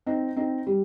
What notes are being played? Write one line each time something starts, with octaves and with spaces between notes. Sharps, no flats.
C4 D#4
C4 D#4
G3